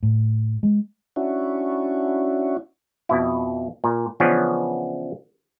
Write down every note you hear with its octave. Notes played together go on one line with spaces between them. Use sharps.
A2
G#3
C#4 D4 E4 F#4
F2 B2 E4
A#2
C#3 E3 F3 B3 C#4 D4